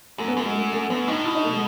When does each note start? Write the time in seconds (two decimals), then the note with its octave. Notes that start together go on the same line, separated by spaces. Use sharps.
0.18 F#2 A3
0.28 B3
0.37 F#2 A3
0.45 G#3
0.55 A3
0.73 A3
0.90 F#2 B3
1.07 A2 D#4
1.25 B2 E4
1.35 D#4
1.43 A3
1.52 G#3